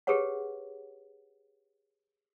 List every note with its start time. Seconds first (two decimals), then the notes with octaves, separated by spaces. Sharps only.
0.07 G4 G#4 A#4 B4 C#5 F#5